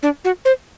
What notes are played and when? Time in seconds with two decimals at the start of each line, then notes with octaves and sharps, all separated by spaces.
0.03 D4
0.25 F#4
0.45 C5